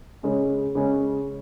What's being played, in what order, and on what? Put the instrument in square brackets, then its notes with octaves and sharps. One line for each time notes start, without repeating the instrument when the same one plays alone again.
[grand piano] C#3 G#3 C#4
C#3 G#3 C#4